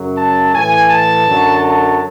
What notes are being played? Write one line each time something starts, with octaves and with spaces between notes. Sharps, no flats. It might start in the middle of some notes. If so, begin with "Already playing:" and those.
Already playing: F#2 C#3 F#3
A5
A2 E3 G#5
A5
F#2 D3 F#3
A5